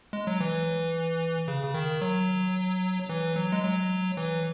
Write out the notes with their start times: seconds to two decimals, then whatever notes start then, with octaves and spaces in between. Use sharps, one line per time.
0.13 G#3
0.27 F#3
0.40 E3
1.48 C#3
1.64 C#3
1.74 D#3
2.01 F#3
3.09 E3
3.36 F#3
3.52 G#3
3.63 F#3
4.17 E3